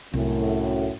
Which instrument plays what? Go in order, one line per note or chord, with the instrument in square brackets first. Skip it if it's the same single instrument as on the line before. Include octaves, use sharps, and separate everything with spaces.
[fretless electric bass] C2 [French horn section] F#2 A2